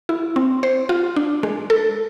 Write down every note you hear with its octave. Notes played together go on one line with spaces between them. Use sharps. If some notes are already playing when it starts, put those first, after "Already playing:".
E4
C4
C5
F4
D4
G#3
A4